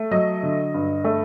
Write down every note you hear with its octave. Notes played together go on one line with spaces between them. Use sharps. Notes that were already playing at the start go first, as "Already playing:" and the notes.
Already playing: A3
F#3 D#5
D3
G2
A3